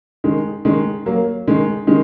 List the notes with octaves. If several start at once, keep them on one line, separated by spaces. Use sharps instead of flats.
D#3 G#3
D#3 G#3
F#3 A#3
D#3 G#3
D#3 G#3